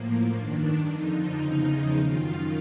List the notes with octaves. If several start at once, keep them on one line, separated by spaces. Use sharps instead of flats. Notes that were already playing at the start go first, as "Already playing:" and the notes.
Already playing: A2 F3 A#3
G2 D#3 D4
F2 D3 F3 D#4
E2 C#3 F3 D#4
F#2 D#3 F4